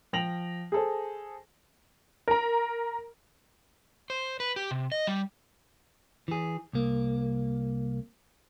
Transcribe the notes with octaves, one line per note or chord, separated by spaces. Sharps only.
F3 G5 A#6 F7 F#7
G#4 A4 C5
A#4 A#5
C5
B4
G4
C3
D#5
G3
E3 G#4
C2 A#3